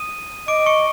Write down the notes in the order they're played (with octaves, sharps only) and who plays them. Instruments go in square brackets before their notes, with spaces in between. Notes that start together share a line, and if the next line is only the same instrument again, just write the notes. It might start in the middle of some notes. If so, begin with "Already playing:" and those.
Already playing: [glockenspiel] D#6 D#7
[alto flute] D#5 [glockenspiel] D6 D7
[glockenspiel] C#6 C#7